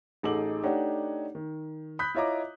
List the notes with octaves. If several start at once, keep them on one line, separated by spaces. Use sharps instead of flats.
A1 D#4 G#4 A4 D6 F#7
A3 D4 D#4 G4 C#5 F#5
D#3
B5 D#6 F#6 G6 B6
E4 F4 C#5 D#5 A#5 D6